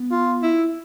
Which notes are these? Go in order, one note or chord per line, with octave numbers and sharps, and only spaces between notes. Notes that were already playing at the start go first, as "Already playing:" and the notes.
Already playing: B3
F4
E4